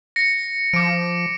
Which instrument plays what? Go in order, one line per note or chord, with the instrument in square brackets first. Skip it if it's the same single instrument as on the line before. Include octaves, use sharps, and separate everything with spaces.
[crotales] A#6 C#7
[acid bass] F3 [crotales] D6 D7